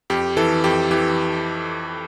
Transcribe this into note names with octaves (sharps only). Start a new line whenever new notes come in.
F2 G4
E3 A4
F2 G4
E3 G4